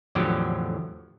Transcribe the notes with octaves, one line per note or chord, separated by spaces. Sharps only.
E2 A2 D3 F3 F#3 G4